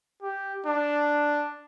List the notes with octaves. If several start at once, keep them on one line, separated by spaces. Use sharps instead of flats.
G4
D4